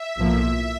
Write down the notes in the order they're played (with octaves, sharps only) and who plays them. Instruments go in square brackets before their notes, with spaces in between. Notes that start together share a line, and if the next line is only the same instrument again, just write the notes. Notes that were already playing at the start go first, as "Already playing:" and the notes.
Already playing: [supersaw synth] E5
[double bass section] B1 A2 F3 A#3 [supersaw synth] E5